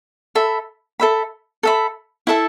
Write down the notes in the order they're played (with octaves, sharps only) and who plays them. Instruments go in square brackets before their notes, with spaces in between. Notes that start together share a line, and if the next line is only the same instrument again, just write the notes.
[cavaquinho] A4 E5 B5
A4 E5 B5
A4 E5 B5
E4 A4 E5 A5